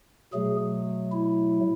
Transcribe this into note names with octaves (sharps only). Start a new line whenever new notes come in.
B2 F#3 A3 G#4
E4